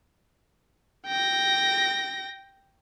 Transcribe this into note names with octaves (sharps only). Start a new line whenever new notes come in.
G5 A#6